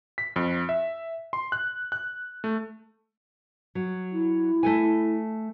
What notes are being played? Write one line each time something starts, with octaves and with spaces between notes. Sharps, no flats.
B6
F2
E5
C6
F#6
F#6
A3
F#3
E4
A3 A4 G#5